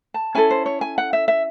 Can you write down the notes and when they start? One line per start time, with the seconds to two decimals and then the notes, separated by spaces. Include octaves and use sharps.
0.14 A5
0.35 C#4 E4 A4 G#5
0.51 C5
0.66 C#5
0.81 G#5
0.98 F#5
1.13 E5
1.28 E5